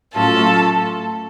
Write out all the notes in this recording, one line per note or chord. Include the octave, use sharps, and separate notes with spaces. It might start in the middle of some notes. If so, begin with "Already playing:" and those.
A2 F#3 A3 C#4 F4 A4 A5